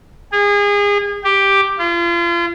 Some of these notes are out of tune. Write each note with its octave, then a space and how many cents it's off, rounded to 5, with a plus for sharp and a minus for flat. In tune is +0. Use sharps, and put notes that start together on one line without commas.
G#4 -30
G4 +5
F4 -35